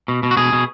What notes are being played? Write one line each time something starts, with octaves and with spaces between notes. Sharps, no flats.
B2
B2
F#4
B2 G#4
B2